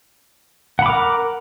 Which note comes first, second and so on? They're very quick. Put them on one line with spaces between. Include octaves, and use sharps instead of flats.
F#5 B5 D6 A#4